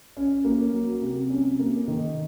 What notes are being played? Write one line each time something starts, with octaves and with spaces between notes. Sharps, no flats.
C#4
A#3
F#3
C3
C#4
A#3
D#3